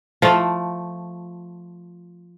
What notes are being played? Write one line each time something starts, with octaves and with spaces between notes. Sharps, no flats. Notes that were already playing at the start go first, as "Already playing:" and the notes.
F3 A3